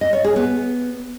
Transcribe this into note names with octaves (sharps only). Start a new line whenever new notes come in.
D#5
C#5
G#4
B3